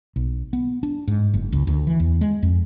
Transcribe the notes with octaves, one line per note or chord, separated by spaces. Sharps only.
B1
B3
D4
G#2
F#1
C#2
D2
E3
E2
G#3
F2